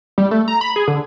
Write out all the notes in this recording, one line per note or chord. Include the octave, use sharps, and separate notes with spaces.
G3
A3
A#5
B5
G#4
D3